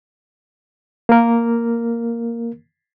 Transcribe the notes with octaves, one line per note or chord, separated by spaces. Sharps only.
A#3 A#4